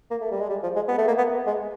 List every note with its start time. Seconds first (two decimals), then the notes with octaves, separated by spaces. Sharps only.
0.11 A#3
0.21 A3
0.31 G3
0.40 G#3
0.50 G3
0.63 F3
0.76 G#3
0.88 B3
0.98 A3
1.07 A#3
1.18 B3
1.47 G#3